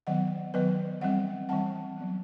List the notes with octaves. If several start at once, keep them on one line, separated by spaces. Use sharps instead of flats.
D#3 F#3 B3 D#5 F#5
D#3 F#3 B3 B4 D#5
E3 G3 C4 D#5 F#5
E3 G3 C4 F#5 A5
F#3 B3